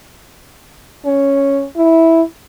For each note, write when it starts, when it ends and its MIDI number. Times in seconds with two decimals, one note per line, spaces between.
1.05 1.64 61
1.76 2.22 64